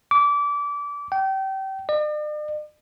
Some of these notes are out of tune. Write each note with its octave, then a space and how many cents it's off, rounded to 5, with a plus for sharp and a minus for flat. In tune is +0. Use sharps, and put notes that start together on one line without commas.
D6 -25
G5 -30
D5 +45